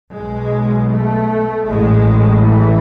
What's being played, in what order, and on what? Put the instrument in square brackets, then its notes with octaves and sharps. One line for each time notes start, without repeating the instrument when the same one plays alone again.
[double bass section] B1 B2 G#3
A3
A1 A2 G#3
E3